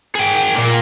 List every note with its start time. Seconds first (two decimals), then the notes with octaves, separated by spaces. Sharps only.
0.15 G#4 G5
0.56 A#2 A#3